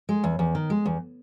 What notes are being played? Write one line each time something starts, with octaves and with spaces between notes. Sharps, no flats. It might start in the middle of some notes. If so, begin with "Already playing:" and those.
G#3
E2
E2
D#3
G#3
E2